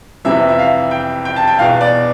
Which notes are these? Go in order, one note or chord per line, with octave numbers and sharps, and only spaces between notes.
F2 C3 E3 E5
E5
F5
G5
G5
A5
G5
E2 B2 F5
D5